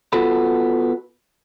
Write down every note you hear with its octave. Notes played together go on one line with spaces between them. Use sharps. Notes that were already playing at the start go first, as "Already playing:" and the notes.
B3 F4 F#4 A4 B5